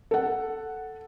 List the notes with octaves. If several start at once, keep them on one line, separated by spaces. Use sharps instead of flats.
A4 F#5